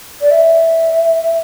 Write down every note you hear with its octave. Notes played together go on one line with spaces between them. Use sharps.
D5
E5